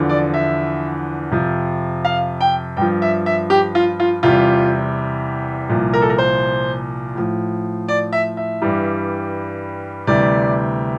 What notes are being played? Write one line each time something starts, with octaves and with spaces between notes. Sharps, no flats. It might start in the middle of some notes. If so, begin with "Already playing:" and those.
Already playing: E2 D3 F3
D5
E5
F2 C3 F3
F5
G5
G2 F3 G5
E5
E5
G4
F4
F4
E2 C3 G3 F4
C2 A#2 F3
A#4
A4
A#4
C5
A2 F3
D5
E5
E5
G2 E3 G3
D2 C3 E3 G3 D5